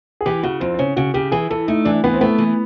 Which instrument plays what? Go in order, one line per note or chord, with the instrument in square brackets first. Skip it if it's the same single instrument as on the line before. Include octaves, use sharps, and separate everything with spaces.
[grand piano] G#4
[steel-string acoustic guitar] E3 [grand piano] G4
[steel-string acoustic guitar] C#3 [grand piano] F#4
[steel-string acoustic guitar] F2 [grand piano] C4
[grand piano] C4
[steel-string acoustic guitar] C#3 [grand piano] C#4
[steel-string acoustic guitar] C#3 [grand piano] F#4
[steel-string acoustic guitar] C#3 [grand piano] G4
[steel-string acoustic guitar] E3 [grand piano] G#4
[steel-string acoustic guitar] E3 [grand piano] A4
[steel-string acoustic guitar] A3 [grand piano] D#4
[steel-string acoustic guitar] E3 [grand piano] D4
[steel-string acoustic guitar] E3 [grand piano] B3
[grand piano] C4
[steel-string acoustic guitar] A3 [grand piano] B3
[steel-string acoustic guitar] E3